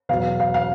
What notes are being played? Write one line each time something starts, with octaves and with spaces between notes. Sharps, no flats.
E2 B2 F#3 F5
F5
F5